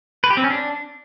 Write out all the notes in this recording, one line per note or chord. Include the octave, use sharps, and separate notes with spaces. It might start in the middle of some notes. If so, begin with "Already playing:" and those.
B4
G4
C4
C#4
D4